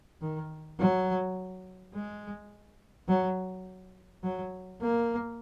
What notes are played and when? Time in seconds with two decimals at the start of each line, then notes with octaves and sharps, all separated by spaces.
0.22 D#3
0.79 F#3
1.95 G#3
3.08 F#3
4.23 F#3
4.81 A#3